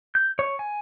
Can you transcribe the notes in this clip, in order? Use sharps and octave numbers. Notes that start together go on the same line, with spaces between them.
G6
C#5
G#5